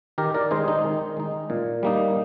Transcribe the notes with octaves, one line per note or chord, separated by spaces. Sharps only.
D#3 G4 A#4
A#4 D5
G#3 D#4 G#4 C5
D#4
D#3
G#3 D#4
A#2
G3 A#3 D#4